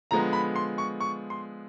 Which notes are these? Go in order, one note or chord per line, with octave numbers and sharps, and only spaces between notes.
D3 F3 G#3 B3 A#5
B5
C6
C#6
C#6
C6